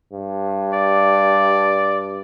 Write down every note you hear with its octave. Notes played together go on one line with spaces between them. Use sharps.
G2
D5